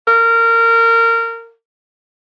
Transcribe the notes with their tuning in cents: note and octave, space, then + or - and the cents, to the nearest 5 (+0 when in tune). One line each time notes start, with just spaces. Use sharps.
A#4 -20